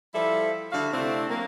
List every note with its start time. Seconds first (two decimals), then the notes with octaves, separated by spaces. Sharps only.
0.13 F3 G3 E4 A4 E5
0.71 D3 G3 F#4 E5 F5
0.92 C3 A3 C4 D4 E4
1.28 F#3 A#3